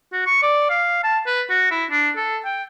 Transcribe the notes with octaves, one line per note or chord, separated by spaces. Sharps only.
F#4
C#6
D5
F5
A5
B4
F#4
E4
D4
A4
G5